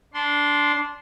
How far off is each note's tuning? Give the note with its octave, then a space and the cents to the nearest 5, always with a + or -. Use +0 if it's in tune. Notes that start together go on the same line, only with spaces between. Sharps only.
D4 -15 C6 +0